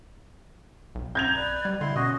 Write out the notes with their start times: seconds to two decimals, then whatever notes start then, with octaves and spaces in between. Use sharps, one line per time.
0.95 B1
1.15 A#5 G6 G#6 F7
1.36 B4 D5
1.65 G3
1.81 D3 E4 D#5 C6
1.96 B2 C#4 F#4 D#5